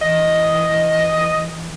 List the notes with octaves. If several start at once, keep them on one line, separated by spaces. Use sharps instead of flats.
E3 D#5